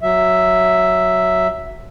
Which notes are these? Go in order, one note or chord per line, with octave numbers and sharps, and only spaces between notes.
F#3 E5